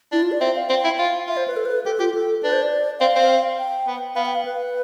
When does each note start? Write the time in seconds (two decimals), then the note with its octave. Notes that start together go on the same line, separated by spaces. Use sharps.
0.12 D4 E4
0.22 F4
0.32 D5
0.41 C4 E5
0.55 F5
0.69 C4 G5
0.84 E4
0.99 F4 F5
1.27 F4 E5
1.37 C5
1.47 B4
1.56 A4
1.65 B4
1.86 G4 A4
1.99 F4 G4
2.14 A4
2.43 D4 B4
2.53 C5
2.62 D5
3.00 C4 F5
3.16 C4
3.58 G5
3.87 B3
4.15 B3 F5
4.26 G5
4.35 F5
4.45 B4